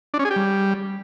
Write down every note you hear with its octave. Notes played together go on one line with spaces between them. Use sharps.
D4
C#4
G#4
G4
G3